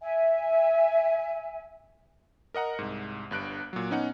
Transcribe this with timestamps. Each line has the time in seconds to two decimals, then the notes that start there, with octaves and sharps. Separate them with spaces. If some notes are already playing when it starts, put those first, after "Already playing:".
0.01 E5 G#5
2.54 A#4 D#5 F#5 A#5
2.79 C2 G#2
3.31 G1 G2 F#6 D7
3.73 A#2 F#3
3.90 B3 C#4 D#4 F#5